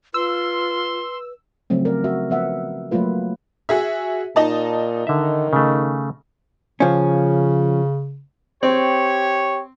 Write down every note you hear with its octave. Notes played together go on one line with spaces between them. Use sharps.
F4 B4 C6 E6
C#3 F3 F#3 A3 C4
A#4 D5
F#4 E5
F3 B3 E5 F#5
F#3 A3 A#3 F4 B4
F#4 G#4 E5
A#2 D#4 D#5 A5
D3 D#3 E5
C#3 A3
C#3 F3 C#4
C4 G4 C#5